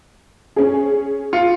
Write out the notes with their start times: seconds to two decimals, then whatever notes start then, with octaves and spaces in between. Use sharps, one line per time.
0.56 C#4 G#4
1.33 F4 C#7